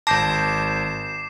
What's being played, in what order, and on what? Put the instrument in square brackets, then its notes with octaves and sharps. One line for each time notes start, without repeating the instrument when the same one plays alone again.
[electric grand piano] G#1 G6 A#6 [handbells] A5 [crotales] D6 C7 E7